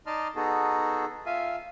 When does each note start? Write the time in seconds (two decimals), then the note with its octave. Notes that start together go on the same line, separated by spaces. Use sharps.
0.06 D#4 D5 D#5 A5 C6 F6
0.36 B3 D#4 F#4 G#4 A4
1.26 F4 E5 F5 G#5